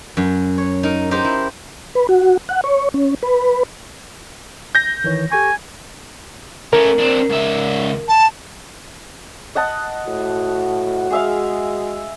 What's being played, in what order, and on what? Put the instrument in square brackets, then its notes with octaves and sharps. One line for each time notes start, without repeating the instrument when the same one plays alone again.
[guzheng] F#2
C#5
D#4 A#4
D#4 G4 A#4 C5
E4
[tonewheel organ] B4
F#4
F#5
C#5
C#4
B4
[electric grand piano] G6 A#6
[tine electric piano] D#3 E3 C#5
[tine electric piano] G4 A4 C#6 [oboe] G#5
[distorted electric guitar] A3 C#4 [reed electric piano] A#4
[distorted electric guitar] C4 D4
C#2 E5
[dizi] A5
[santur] D#5 F#5 A5
[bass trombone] A2 [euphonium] F#4
[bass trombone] G#3 [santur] G#4 E5 F5